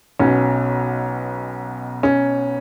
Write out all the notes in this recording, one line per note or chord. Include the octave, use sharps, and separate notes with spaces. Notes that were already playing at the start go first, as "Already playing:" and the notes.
B1 B2 C#4
C#4